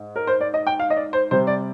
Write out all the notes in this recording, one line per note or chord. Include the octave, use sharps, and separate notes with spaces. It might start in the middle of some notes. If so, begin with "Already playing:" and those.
Already playing: G#2
A#4
C5
D5
D#5
G5
F5
D#5
D5
C5
C3 G3 C5
D5